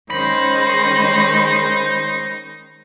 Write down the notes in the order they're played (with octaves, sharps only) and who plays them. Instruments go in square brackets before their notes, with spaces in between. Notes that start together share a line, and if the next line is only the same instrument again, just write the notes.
[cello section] D#3 G#3 C#4 [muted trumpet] D#4 [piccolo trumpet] C5 [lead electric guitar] B5